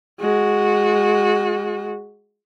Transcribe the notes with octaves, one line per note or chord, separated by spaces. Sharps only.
G#3 F#4